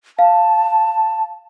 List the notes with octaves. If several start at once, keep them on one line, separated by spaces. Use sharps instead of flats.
F5 A5